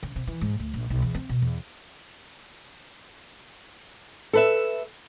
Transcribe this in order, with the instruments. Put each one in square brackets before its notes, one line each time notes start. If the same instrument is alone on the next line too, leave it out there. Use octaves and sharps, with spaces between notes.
[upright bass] C#3
C3
E3
G#2
D2
A#1
B1
E2
C4
B2
E2
[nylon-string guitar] A4 B4 E5